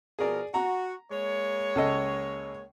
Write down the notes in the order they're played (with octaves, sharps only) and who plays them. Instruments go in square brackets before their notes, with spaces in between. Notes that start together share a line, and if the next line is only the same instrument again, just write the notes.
[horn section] B2 F3 A#4 [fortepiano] G#4 D5
[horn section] F#4 [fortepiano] A#5
[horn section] G#3 A#3 C#5
[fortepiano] C#2 A4 D#5